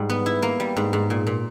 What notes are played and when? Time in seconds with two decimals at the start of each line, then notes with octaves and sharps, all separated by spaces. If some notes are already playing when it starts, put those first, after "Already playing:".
Already playing: G#2 G3
0.10 B3
0.26 E4
0.42 A#3
0.60 G3
0.77 G#2
0.93 G#2
1.10 A#2
1.27 A#2